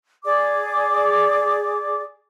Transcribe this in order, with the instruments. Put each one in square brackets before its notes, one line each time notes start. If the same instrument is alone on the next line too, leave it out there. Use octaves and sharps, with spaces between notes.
[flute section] G#4 D5 D6